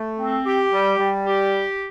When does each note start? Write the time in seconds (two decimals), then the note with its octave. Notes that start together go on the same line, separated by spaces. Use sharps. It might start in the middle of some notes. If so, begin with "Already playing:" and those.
Already playing: A3
0.19 C4
0.45 G4
0.72 G3
0.98 G3
1.25 G4